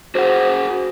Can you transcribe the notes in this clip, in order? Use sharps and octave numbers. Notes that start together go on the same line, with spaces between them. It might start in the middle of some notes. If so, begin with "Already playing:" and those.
F#4 G#4 C5 F#5